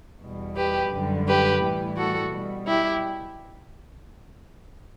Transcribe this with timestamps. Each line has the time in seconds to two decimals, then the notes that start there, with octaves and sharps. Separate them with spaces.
0.21 E2 B2 G3
0.56 G4 B4
0.91 F#2 D3 G3
1.28 G4 B4
1.62 A2 E3 G3
1.97 F#4 A4
2.33 B2 G3
2.68 E4 G4